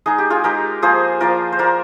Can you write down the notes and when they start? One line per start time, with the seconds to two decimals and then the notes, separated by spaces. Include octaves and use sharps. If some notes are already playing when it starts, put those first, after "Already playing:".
0.06 G#3 D#4 G#4
0.18 G4
0.30 F4 G#4
0.44 G#3 D#4 G4 A#4
0.82 F3 A#3 F4 G#4 C5
1.20 F3 A#3 F4 A#4 D5
1.52 C5
1.59 A#3 F4 A#4 D5